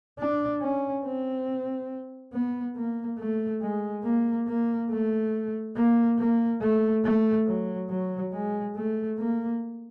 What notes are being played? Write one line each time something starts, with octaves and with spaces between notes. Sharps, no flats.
D4
C#4
C4
B3
A#3
A3
G#3
A#3
A#3
A3
A#3
A#3
A3
A3
F#3
F#3
G#3
A3
A#3